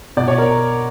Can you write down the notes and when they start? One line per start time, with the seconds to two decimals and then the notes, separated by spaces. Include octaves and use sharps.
0.17 B2 D5
0.28 C#5
0.38 A#4